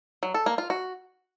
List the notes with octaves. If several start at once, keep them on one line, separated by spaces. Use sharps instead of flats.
F#3
A4
A#3
F4
F#4